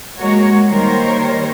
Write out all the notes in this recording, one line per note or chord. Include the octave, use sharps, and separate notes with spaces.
G#3 A#3 F#4 A#4 C#5
D#3 G3 A#3 A#4 C5 C#5